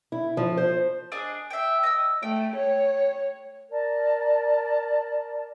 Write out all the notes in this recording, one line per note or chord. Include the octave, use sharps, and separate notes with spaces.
E4
F3
C5
D4 G#4 D#5
E5 G5
D#5 D#6 E6
A3 G5
C#5
A#4 D5 A5